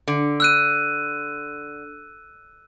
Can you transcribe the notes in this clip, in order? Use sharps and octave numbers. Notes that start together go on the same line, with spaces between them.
D3
E6 F#6 D#7